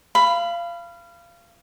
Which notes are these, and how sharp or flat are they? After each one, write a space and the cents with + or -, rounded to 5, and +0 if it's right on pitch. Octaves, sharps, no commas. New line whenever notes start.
F5 -25 B5 +10